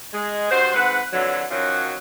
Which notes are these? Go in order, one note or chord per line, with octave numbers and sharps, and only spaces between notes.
G#3
G2 F#4 C5
G#2 C4 B4 F#5
F2 D3 E3 F#3
D#3 F3 F#3 C#4 F#4